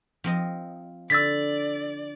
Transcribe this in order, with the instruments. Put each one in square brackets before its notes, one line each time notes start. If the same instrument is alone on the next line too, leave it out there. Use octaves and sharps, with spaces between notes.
[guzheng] F3 C4 D#5
[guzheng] D3 [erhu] D5 [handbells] E6 A6 B6